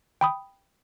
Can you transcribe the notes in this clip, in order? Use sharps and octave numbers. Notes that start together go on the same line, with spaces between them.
G5 B5 D#6